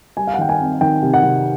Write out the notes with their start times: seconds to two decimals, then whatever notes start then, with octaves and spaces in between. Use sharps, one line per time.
0.17 G3 G#5
0.27 F5
0.34 F#5
0.38 D#3 G5
0.49 G#5
0.60 C4
0.81 D#3 G5
1.02 C3
1.14 F#5
1.23 C3